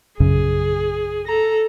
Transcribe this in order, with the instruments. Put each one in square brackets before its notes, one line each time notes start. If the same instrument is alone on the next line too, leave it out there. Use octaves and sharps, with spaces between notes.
[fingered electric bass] A#1 F#2 C#3 [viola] G#4
[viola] A4 A#5